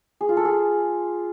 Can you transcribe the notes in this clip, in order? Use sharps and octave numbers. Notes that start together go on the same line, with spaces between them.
G#4
F4
A4
G#4